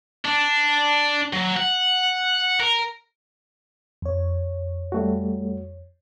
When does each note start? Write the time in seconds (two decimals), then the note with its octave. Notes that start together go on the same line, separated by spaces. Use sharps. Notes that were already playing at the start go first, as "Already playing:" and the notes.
0.25 D4
1.33 F#3
1.56 F#5
2.60 A#4
4.02 F2 C#5
4.92 G3 A3 F#4